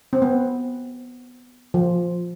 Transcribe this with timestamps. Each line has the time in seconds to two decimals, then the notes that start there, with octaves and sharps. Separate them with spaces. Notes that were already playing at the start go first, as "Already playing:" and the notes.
0.13 C4
0.22 B3
1.74 F3